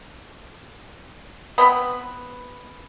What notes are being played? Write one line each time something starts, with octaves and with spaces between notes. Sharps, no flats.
B3 C4 B4